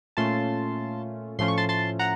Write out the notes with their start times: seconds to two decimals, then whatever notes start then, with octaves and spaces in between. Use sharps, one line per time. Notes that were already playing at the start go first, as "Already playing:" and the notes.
0.17 A#2 A3 C#4 F4 A5 C6
1.39 A2 F3 A3 C#4 F4 C6
1.48 C#6
1.58 A5 C6
1.69 A5 C6
1.99 F#5 A#5